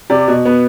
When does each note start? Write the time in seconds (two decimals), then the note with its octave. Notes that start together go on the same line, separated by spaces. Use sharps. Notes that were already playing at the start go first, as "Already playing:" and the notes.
0.10 C3 D5
0.28 B2
0.45 B3